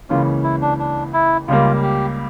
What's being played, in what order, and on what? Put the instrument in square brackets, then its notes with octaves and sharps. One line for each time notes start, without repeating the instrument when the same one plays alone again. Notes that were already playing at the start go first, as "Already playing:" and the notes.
[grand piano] C#2 C#3 E3 A#3 C#4 [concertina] F4
[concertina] E4
D4
D4
E4
[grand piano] C#2 C#3 G3 A#3 [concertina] F4
[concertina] G4